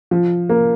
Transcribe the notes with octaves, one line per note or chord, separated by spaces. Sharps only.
F3
A#3